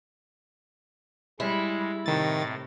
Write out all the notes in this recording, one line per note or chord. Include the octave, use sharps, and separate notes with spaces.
G3 G#3 E4
A2 C3 D#3 A6